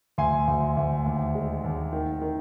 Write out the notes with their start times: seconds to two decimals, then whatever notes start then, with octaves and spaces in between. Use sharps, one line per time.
0.18 D2 G#5 C6
0.48 D2
0.77 D2
1.06 D#2
1.35 G#3
1.64 D#2
1.93 D#3
2.21 D#3